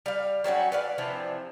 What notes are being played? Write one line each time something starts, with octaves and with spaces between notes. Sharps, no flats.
G3 F5
F#3 G3 C#4 F#4
B4 D5 F5
C3 E3 F3 D4